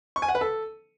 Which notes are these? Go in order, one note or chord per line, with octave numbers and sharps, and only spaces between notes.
C#6
G#5
F#5
B4
A4